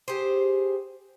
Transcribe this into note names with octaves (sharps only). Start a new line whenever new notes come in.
G4 G#4 C5